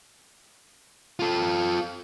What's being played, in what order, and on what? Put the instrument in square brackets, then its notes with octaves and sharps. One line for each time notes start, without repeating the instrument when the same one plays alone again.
[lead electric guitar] F4 A4